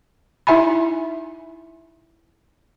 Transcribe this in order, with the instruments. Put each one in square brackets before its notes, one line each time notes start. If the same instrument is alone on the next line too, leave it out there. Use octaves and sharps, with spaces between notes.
[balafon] D#4 E4 E5 G#5 B5